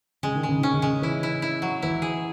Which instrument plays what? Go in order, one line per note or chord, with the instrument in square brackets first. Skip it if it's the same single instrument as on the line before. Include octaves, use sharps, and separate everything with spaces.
[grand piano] C#3 [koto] G#3
[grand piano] D#3
[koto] G#3
[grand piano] C#3
[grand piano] D#3 [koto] C#4
[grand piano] C#3
[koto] G#3
[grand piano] E3 [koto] E4
[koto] E4
E4
F#3
[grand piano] E3 [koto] E4
[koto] G#4